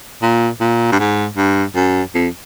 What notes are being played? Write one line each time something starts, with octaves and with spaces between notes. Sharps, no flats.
A#2
A#2
G2
G#2
G2
F#2
F2